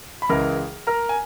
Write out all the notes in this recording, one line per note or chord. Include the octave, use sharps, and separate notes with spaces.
B5
C#2 C#3 E3 G#3 A#4 A#5
A#4 A#5
G#5